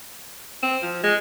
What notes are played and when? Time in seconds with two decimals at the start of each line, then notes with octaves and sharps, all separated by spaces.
0.63 C4
0.82 F3
1.03 G#3